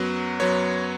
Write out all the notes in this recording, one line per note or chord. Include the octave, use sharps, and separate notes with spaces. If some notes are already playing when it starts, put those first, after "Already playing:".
Already playing: F#2 F#3 B3
F#2 F#3 B3 C#5